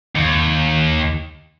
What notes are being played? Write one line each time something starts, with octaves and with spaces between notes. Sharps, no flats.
D#2